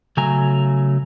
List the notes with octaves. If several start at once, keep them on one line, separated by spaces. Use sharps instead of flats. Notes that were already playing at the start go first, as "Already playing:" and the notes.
C#3 F#3 A3 G#5 A#5